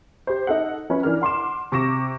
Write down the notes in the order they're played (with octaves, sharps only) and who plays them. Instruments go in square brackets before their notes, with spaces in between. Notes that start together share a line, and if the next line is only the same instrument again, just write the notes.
[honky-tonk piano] G4 C5
D#4 A4 F#5
F3 C#4 B4
E3 D4 A#4 F6
F#5 C6 D6 E7
C3 C#6 D6 A#6 E7